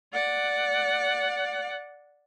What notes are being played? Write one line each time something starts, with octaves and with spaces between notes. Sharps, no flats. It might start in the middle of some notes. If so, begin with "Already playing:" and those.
D5 F#5